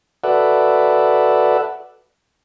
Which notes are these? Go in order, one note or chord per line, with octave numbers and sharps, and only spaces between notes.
F#4 A4 B4 D5 E5 F#5